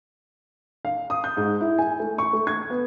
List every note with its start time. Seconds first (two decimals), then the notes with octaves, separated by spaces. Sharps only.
0.85 F5
1.10 D#6
1.24 G6
1.37 G#2
1.61 E4
1.78 G#5
2.00 A3
2.18 C#6
2.33 A3
2.47 G#6
2.70 B3